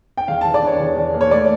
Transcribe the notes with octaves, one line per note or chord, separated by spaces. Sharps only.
G5
E2 F5
A5
E3
D5
D4 C#5
E2
E2
A#3
C#5
A3 D5